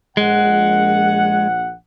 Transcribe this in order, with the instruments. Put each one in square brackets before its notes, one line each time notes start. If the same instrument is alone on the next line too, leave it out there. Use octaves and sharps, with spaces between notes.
[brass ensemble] A#1 F#5 [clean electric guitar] G#3